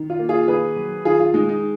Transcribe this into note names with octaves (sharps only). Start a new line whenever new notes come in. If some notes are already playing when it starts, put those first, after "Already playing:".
Already playing: D#3
F4
A#3
F4 G#4
D#3 G#4 B4
F#3
D#3 F4 G#4
F4
G#3 D#4
D#4